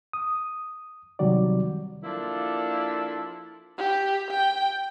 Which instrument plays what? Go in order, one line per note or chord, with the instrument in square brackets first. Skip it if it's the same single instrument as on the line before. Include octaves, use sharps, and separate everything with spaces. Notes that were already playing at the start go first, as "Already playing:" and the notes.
[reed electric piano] D#6
C3 D#3 F#3 G3 F#4 D5
[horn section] F3 A#3 D4 E4 A4
[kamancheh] G4
G5